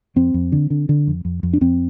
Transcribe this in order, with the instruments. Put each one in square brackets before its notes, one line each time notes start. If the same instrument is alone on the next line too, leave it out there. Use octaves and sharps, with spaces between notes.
[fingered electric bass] F2 C4
F2
D3
D3
D3
F2
F2
F2
D4
F2 C4